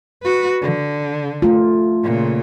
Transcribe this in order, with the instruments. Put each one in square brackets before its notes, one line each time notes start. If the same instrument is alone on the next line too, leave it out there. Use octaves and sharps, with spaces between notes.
[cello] F#4 B4
D3
[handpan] A3 F4
[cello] A#2 C#3